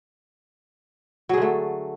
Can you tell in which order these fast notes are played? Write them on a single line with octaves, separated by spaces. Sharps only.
F#3 G#4 D3 A3